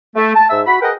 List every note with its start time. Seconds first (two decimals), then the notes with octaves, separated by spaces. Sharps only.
0.16 A3
0.35 A5
0.50 G#2 E5 E6
0.67 F#4 B5
0.81 G#4 A#4 B4 D#5 F#5 G5